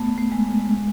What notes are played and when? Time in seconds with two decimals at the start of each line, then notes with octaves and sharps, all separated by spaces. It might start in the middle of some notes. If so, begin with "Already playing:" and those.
Already playing: A3 B3
0.18 A3
0.32 G#3
0.59 G#3